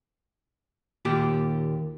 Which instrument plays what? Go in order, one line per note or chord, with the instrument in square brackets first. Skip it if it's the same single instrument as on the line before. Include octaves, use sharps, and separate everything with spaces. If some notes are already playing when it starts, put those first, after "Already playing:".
[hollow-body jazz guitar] D#2 A#2 G4